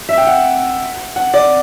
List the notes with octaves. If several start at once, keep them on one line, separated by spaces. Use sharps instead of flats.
E5
G5
F#5
F#5
D5